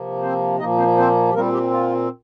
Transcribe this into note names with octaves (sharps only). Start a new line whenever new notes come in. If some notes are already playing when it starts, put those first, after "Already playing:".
Already playing: C3 F3 A#3
C4 C5
A#2 F3 A#3 D#4 D#5
C4 C5
C4 C5
G4
A#2 G3 A#3 C4 A#4
G3 G4
F4